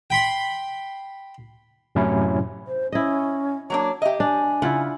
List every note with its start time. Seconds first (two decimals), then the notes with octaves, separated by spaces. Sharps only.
0.10 G5 B5 C6
1.95 F#2 A2 C3 F#3 C#4 E4
2.67 C5
2.92 C#4 E4 D#5
3.70 F#3 A#3 D4 C#5
4.02 G4 D#5 E5
4.20 D4 G#5
4.62 C#3 E4 F4 F#5